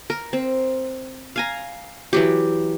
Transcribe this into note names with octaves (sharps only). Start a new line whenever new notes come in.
A#4
C4
F5 G#5 A#5
E3 F#3 G4